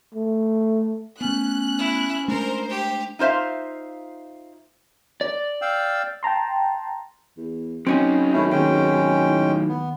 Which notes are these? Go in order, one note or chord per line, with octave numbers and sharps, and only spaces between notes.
A3
A3 B3 C#4 F#6
E4
G#3 A3 D4 A#4 C5
G4
D#4 F4 C5 E5 F5
D5
F5 G5 E6
G5 A5 A#5 C6
E2
F#1 F#3 C4 C#4 D#4 G#5
G#1 A3 C#4 E4
D#2 G#3 C#4 G5
A2
B3